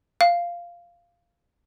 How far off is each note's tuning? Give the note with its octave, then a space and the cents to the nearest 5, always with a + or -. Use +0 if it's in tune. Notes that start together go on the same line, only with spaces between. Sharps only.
F5 -10